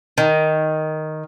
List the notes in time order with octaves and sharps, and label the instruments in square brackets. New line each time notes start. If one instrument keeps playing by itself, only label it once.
[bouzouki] D#3